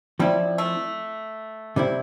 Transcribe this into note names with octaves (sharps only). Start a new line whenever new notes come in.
F3 G3 C4 E4
A3
C3 G3 C4 E4